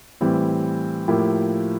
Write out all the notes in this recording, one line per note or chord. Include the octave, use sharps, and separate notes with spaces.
A2 E3 G3 C4 E4
A2 F3 A#3 E4 G4